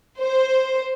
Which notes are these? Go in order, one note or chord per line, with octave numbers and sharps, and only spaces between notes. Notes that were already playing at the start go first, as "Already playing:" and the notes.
C5